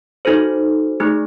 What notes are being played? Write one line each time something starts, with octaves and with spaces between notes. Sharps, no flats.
D#4 F#4 A4 C5
A3 D#4 G#4